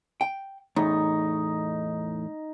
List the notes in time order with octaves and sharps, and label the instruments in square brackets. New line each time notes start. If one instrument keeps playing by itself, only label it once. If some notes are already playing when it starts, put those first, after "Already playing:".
[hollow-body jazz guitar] G5
[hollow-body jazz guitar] E2 A2 [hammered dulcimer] D#4 C#6